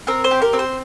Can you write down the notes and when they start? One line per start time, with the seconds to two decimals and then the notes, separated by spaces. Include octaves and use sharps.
0.07 C4 A#4
0.24 C5
0.31 G4
0.42 A#4
0.53 C4
0.59 C5